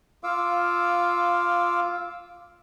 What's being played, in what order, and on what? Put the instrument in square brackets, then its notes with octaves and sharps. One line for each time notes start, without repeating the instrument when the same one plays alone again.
[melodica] F4 F5 D6 E6